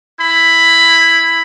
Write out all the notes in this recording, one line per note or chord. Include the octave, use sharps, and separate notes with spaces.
E4 B5